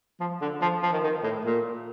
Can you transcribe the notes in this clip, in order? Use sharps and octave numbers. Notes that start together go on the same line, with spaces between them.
F3
D3
F3
F3
D#3
D#3
A2
A#2